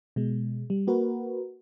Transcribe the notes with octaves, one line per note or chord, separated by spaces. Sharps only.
B2 G#3
G3
A#3 F#4 A#4 B4